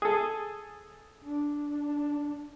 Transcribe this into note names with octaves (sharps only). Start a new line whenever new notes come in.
G#4 A4
D4